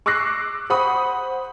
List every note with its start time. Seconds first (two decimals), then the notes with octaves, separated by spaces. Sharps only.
0.06 C#6 D6 E6 F#6 A#6 C7
0.70 C5 F#5 B5 C#6 D#6